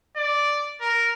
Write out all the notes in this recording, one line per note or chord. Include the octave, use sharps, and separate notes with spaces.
D5
A#4